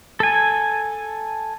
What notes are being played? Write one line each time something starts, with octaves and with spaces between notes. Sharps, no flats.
A4 G#5